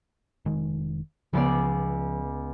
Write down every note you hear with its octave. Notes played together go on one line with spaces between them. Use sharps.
F1 D#3 G#3
C#2 F3 B3 D5